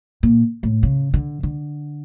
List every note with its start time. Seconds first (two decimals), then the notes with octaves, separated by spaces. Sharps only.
0.23 A#2
0.63 A2
0.83 C#3
1.14 D3
1.43 D3